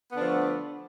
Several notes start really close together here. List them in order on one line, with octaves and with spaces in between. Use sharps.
B3 D3 D4 F3 A3